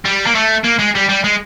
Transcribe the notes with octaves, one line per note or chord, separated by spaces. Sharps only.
G3
A#3
A3
A#3
G#3
G3
G3
G#3